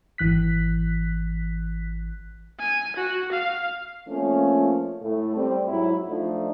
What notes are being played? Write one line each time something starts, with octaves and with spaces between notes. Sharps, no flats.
G#1 E3 F#6 B6
G#5
F#4
F5
F3 A3 A#3 C4 C#4
A2 A3
G3 C4
G#2 F#3 E4
F3 A3 D4 D#4